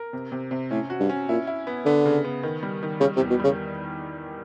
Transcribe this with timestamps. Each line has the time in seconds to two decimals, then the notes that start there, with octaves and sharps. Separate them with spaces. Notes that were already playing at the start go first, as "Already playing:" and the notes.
Already playing: A#4
0.13 C3
0.32 C3
0.51 C3
0.71 A2 C#4
0.90 F#4
1.00 G2
1.09 C#4
1.29 A#2 E4
1.47 E4
1.67 B3
1.85 D3 B3
2.05 C#3
2.25 B3
2.43 D#3
2.63 G3
2.83 D#3
3.01 C#3 G3
3.16 C3
3.20 E2
3.30 B2
3.40 C#3 G3